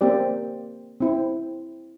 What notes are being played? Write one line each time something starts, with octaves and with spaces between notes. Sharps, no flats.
A#3 C4 G4 D5
C4 E4